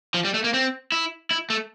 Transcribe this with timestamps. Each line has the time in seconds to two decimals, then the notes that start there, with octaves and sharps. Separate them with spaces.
0.14 F3
0.25 G3
0.34 A3
0.44 A#3
0.54 C4
0.92 E4
1.31 E4
1.50 A3